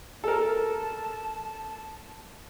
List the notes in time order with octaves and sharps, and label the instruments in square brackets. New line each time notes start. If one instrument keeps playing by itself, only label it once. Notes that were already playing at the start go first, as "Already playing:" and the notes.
[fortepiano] A4 A#4 [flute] A5